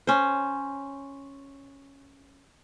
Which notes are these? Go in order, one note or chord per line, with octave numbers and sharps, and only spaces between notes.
C#4 C5